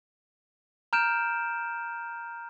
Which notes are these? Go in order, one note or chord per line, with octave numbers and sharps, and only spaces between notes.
A#5 F6 G6 D7 E7